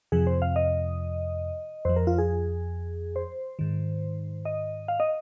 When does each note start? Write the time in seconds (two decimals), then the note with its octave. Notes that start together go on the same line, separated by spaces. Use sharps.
0.12 F2 C3 F3 G#4
0.27 C5
0.42 F5
0.56 D#5
1.85 F2 F3 C5
1.96 A#4
2.07 F4
2.18 G#4
3.16 C5
3.59 G#2 D#3
4.45 D#5
4.88 F5
5.00 D#5